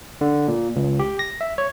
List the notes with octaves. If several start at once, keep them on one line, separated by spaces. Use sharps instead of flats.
D3
A#2
C#2
G4
A#6
E5
C#5